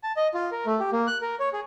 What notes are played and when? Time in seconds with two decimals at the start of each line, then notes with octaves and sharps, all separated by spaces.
0.03 A5
0.17 D#5
0.34 F4
0.52 A#4
0.66 A3
0.80 G4
0.92 A#3
1.07 F#6
1.22 A#4
1.40 C#5
1.53 G#4